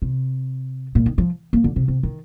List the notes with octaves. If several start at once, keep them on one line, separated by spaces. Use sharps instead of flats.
C3
A#2
D#3
F3
A#3
D3
C3
C3
D#3